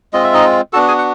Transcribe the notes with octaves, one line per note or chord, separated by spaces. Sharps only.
G#3 C4 F4 D#5
E5
D#4 D#5
B3 D4 F#4 A4 A5
G#4 G#5
F#5